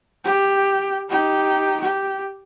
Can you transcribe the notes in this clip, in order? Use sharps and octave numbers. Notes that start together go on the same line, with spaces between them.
G4
D#4 G4
G4